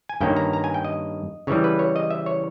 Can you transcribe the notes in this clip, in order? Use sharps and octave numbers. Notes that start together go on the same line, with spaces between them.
G#5
G2 D#3 A#3 C#4 G5
A#5
A#5
G#5
G5
D#5
C#3 E3 G3 C#5
B4
C#5
D#5
E5
C#5